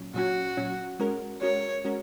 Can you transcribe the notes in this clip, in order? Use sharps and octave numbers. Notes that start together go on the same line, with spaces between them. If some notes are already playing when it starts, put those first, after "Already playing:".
Already playing: A#2 F#3 C#4
A#2 F#3 C#4 F#4
A#2 F#3 C#4
G#3 C#4 F#4 A#4
G#3 C#4 F#4 A#4 C#5
G#3 C#4 F#4 A#4